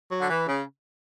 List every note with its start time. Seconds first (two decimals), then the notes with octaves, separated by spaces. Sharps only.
0.10 F#3
0.21 D3
0.29 E3
0.47 C#3